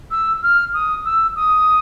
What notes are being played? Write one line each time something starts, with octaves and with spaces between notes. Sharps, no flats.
E6
F6
D#6
E6
D#6